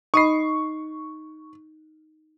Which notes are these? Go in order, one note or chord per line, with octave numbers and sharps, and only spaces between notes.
D#4 D#5 B5 C#6 C7